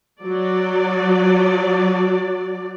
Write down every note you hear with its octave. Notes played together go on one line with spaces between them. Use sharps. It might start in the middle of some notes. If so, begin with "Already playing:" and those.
F#3 D5